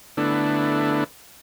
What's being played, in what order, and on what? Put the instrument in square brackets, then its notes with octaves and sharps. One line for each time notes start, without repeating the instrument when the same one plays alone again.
[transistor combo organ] D3 A3 B3 D4 E4